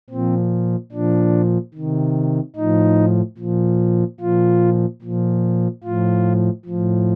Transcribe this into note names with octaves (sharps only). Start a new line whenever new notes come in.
A#2 F3 C4
A#2 F3 D4
C3 D#3
A2 F3 D#4
A#2 F3
A#2 F3 F4
A#2 F3
A2 F3 F4
A2 F3